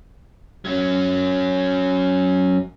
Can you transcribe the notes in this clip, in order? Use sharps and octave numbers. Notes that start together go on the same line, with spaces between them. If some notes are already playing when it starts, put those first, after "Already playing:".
F#3 C#4